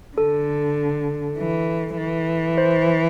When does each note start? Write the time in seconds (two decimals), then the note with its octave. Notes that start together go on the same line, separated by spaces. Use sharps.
0.17 D3 A4
1.38 E3
1.97 E3
2.58 C5